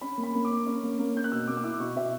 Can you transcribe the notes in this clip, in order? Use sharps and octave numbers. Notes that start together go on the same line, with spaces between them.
C#4 B5
A#3
B5
A#3
D6
C#4
C#4
A#3
A#3
A#3 G6
F#6
B2 E6
A#3 D6
E6
E4 D6
B2 C#6
B2 E5